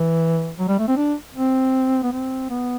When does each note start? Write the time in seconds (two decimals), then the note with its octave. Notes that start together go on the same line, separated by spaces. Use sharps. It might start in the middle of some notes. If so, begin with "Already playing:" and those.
Already playing: E3
0.59 F#3
0.68 G3
0.79 A3
0.88 C4
0.97 D4
1.35 C4
2.03 B3
2.12 C4
2.50 B3